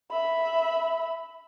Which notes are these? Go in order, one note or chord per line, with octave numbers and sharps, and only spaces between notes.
E5 B5